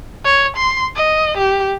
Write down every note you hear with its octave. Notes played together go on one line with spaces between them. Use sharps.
C#5
C6
D#5
G4